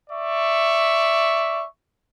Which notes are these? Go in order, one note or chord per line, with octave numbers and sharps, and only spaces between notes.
D5 E5 C#6